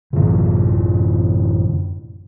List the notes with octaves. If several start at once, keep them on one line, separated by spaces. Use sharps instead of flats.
F#2 A2 D3 E3